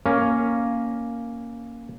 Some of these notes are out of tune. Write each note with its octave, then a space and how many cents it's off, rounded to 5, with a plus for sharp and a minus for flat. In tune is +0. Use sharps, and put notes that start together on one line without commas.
A#3 +0 C#4 +0